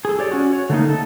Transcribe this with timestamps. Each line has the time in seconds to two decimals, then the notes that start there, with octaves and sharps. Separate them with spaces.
0.05 G#4 A4
0.19 G4 C#5 D5
0.31 C#4 F#4
0.53 C#5
0.69 D3 A3 A#3 D#4
0.89 A4